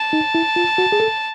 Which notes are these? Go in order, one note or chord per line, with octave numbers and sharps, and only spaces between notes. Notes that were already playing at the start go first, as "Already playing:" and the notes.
Already playing: A5
D#4
E4
F4
F#4
G#4
A4